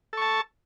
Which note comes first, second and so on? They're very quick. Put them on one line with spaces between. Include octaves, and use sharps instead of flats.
A4 C#6 A5